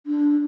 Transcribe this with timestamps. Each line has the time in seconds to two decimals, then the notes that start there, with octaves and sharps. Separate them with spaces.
0.07 D4